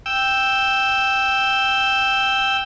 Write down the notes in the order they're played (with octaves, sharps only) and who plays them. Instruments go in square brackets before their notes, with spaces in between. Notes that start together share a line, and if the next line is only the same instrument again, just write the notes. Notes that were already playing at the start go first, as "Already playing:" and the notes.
[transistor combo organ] G5 E6